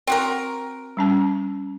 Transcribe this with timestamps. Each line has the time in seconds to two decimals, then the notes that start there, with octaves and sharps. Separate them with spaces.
0.07 C4 F#4 A#4
0.97 G3 C#4 A5